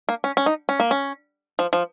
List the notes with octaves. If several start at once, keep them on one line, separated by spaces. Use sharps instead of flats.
A#3
C#4
C#4
D#4
C#4
A#3
C#4
F3
F3